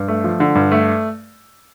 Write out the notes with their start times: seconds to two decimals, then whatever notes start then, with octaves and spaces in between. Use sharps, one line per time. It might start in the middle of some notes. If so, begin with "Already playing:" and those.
Already playing: G2
0.08 A3
0.24 F3
0.40 D3
0.55 G2
0.72 A3